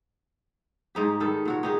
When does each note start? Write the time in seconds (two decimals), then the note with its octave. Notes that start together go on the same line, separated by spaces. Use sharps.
0.95 G#2 D#4 G4
1.20 D#3 G3 A4
1.45 A#2 F#4 C#5
1.63 D#4 G4 G#4